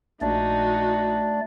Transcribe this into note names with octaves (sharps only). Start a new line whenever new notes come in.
A#1 A3 D4 D#4 F#4 D5